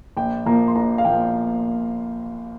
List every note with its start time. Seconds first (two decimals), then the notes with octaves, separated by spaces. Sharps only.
0.17 A#1 G5
0.46 A#2 F3 A#3 A#5
0.68 C6
0.75 A#1 A#5
0.98 F5
1.05 A#2 F3 A#3 G5